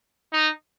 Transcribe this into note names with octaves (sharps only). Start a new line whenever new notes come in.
D#4